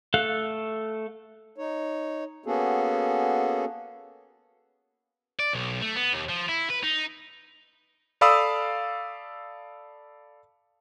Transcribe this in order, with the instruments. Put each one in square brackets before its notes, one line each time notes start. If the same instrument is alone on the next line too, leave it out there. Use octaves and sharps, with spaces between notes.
[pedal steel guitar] A3 A4 F5 F#6
[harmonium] D#4 C#5
A#3 B3 C#4 F#4 G#4 A4
[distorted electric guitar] D5
B1
A3
B3
D#2
F3
E4
B4
D#4
[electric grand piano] A4 D5 F5 B5 D#6 E6